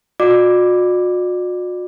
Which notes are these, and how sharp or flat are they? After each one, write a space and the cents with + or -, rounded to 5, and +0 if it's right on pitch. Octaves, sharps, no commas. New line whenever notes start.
F#4 -40 D5 +40 D6 +0